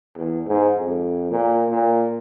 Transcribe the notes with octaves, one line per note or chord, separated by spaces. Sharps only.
E2
G#2
F2
A#2
A#2